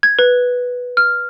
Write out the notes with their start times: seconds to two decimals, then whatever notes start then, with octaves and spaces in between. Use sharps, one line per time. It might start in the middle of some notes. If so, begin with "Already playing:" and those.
0.03 G#6
0.19 B4
0.97 F6